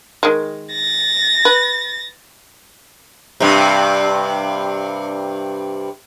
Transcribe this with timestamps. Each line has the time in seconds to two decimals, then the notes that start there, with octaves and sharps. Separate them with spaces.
0.23 D#3 G#3
0.73 A6 A#6
1.45 B4
3.40 G2 C3